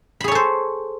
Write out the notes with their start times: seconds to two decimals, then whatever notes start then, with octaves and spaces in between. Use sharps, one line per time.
0.21 B5
0.24 G#4
0.28 C#5
0.32 A4
0.35 C5